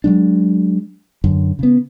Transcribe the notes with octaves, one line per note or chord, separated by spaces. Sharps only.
F#3 G#3 D4
F#2 D3
C#3 B3